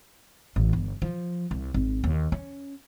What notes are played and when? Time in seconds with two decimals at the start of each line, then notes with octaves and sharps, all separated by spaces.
0.56 A1
0.73 G1
1.02 F3
1.51 C2
1.74 G#1
2.04 D#2
2.32 C#4